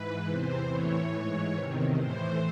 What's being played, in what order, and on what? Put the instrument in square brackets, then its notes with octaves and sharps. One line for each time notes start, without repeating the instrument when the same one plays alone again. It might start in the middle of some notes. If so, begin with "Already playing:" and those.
Already playing: [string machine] G#2 E3 B4
E2 C3 E3 C5
A2 E3 C#5
G#2 E3
E2 C3 D#3
A2 E3 C5